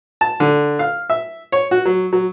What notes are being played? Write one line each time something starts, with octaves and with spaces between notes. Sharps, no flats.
A5
D3
F5
E5
C#5
F#4
F#3
F#3